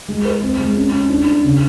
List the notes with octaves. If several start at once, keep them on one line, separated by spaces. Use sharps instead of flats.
G#3
A#4
C4
G#3
C#4
C#4
D4
D4
C#3